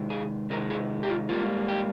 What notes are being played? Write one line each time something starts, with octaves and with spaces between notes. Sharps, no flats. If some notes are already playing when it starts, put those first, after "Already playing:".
Already playing: C3 D#3 G#3
G#4
C3 D#3 G#3 A#4
G#4
G4
F4
G#2 D#3 G3 A#3 F4
G4